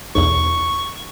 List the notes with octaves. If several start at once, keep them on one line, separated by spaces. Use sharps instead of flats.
B1 E2 C#6